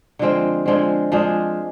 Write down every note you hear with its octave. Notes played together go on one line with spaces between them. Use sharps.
D3 F3 G#3 C4
D3 F3 G#3 C4
F3 G#3 D4 G#4